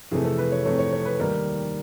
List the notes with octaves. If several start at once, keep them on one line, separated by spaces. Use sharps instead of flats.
F2 C3 E3 A3 G#4
A4
B4
C#5
F2 C3 E3 A3 C#5
C#5
C#5
B4
D#2 D#3 G3 A#3 A#4